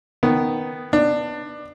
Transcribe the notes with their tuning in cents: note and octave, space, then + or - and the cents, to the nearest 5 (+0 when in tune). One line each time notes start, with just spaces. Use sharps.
D#3 +0 B3 +0
B3 +0 D4 +20